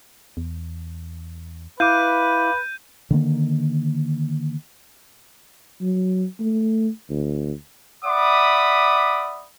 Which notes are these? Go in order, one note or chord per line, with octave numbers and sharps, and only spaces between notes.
E2
E4 B4 F5 D6 G6 D#7
D3 D#3 A#3
F#3
A3
D2
D5 E5 F#5 B5 D6 D#6